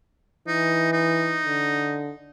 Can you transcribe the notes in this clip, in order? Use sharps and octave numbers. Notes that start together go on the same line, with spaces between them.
E3 D#4
D#4
D3